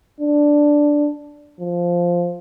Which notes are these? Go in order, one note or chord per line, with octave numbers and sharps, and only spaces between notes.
D4
F3